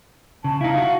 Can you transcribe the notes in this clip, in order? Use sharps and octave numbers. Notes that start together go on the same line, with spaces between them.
C#3 A5
D#4 E4 F5
F#4